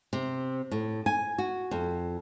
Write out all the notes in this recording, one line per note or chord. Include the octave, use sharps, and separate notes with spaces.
C3
A2
G#5
F#4
F2